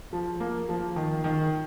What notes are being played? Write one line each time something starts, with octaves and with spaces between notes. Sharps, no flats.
F3
A#3
F3
D#3
D#3